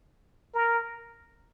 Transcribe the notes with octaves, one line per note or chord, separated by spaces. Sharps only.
A#4